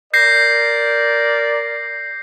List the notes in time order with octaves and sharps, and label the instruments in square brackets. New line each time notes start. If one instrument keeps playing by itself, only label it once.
[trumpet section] A#4 D5 [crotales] G6 A#6 C7